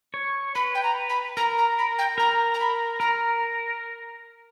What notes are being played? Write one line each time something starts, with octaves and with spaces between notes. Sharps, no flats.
C#5
B4 B5
G5
A#5
B5
A#4 A#5
A#5
B5
G5
A#4 A#5
A#5
B5
A#4 A#5